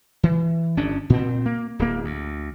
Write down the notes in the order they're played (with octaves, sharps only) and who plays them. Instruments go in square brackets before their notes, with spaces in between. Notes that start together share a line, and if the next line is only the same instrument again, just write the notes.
[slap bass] E3
G1 C#4 D4
A#2 C4
A#3
D1 A#3
D2